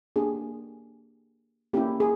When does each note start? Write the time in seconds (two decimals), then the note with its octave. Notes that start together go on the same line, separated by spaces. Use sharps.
0.16 A#3 D4 G4 G#4
1.73 A#3 C#4 E4 G4
2.00 G#4